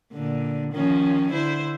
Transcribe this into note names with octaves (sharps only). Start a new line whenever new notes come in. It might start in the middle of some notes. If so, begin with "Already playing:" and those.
A#2 D3
D#3 F3 C#4
D3 E4 C5